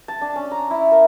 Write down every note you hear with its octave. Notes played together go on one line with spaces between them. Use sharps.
A5
D4
C#4
A#5
E4
A#4